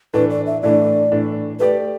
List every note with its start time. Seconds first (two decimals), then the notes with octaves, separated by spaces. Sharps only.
0.14 A2 E3 A3 D4 B4
0.30 D5
0.46 E5
0.62 A2 E3 A3 D4 D5
1.12 A2 E3 A3 D4
1.60 A3 G4 B4 D5